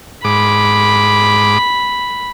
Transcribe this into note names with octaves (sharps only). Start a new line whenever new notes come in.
G#2 B5 D6